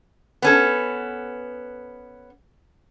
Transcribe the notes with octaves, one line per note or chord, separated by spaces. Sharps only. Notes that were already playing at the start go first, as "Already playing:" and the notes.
B3 C#4 A4